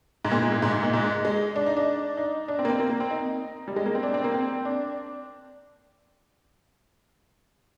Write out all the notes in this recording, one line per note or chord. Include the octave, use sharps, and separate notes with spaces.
G#2
A#2
G#2
A#2
G#2
G#2
A#2
G#2
G#3
D4
D#4
D4
D#4
D4
C4
A#3
C4
A#3
A#3
C4
D#4
G3
G#3
A#3
C4
D4
C4
A#3
C4
D4